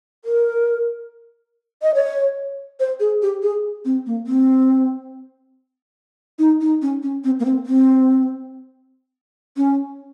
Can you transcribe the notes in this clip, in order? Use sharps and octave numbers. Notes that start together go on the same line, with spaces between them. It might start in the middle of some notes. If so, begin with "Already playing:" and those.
A#4
D#5
C#5
C5
G#4
G4
G#4
C4
A#3
C4
D#4
D#4
C#4
C#4
C4
A#3
C4
C4
C#4